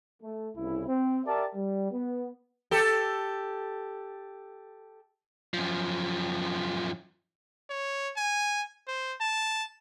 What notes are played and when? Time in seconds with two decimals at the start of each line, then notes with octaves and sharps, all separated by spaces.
0.22 A3
0.56 C2 C#3 E4
0.88 C4
1.26 G4 A#4 D5 E5 A5
1.56 G3
1.92 B3
2.71 G4 A4
5.54 F#2 F3
7.70 C#5
8.17 G#5
8.88 C5
9.21 A5